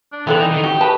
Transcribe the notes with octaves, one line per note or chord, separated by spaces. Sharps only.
D4
E3 B3 C4 A4 D5
D#4
D#3
F#4 G4
B4 A5